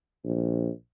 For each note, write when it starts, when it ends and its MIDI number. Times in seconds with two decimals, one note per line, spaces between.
0.24 0.69 34